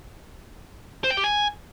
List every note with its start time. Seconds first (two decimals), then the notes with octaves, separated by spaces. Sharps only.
1.04 C5
1.11 G5
1.17 G4
1.24 G#5